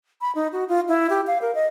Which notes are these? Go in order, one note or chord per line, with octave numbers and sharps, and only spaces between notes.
B5
D#4
F#4
F4
E4
G4
F5
A#4
D#5